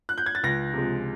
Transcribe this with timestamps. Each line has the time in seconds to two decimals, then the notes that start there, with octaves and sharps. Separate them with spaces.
0.09 F#6
0.18 G6
0.26 G#6
0.35 A6
0.43 C#2 A#6
0.74 C3 F3 G#3